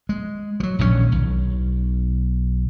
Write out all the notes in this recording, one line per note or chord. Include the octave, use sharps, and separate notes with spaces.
G#3
F3 F#3
A#1 D#2 C#3 C#4
B1